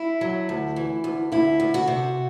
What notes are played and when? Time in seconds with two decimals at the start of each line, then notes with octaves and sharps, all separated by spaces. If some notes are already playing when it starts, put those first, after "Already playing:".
Already playing: E4
0.21 F#3
0.49 D2
0.76 E3
1.04 D2
1.32 D2 E4
1.60 D2
1.74 F#4
1.87 C3